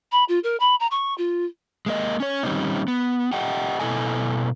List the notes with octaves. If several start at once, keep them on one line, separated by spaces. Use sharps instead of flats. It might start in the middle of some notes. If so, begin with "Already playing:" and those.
B5
F4
A#4
B5
A#5
C#6
F4
G#3 A#3 D#5
C#4 C#5
D#3 G3 G#3 C4 C#4 D#4
B3
G4 D#5 F#5 G5
B2 C4 E4 A4 D#5 G#5